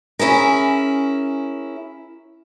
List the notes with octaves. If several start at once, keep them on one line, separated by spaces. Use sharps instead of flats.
C#4 E4 G#4 A#4